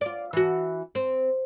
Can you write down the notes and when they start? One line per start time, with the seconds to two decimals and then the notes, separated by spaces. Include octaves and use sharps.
0.01 F4 D5
0.33 E3 F#4
0.95 C4